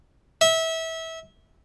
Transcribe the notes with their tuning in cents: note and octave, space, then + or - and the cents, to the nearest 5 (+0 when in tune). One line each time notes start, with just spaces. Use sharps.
E5 -25